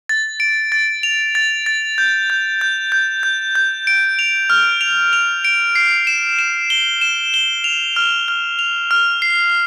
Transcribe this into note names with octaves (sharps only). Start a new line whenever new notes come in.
A6
D7
A6
F7
A6
A6
G6
G6
G6
G6
G6
G6
D7
F7
F6
F7
F7
D7
C7
E7
E7
G7
E7
G7
F7
F6
F6
F7
F6
C7